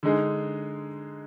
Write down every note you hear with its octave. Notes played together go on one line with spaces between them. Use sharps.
D3 G#3 D#4 G#4